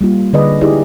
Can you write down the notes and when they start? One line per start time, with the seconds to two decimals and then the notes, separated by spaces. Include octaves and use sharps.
0.01 G3 A#3 F4
0.33 D3 G#4 B4 D5 D#5
0.61 D#4 E4 G4 G#4 D5